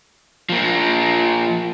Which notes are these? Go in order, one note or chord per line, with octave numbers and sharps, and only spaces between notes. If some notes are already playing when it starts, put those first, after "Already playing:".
F3 A#3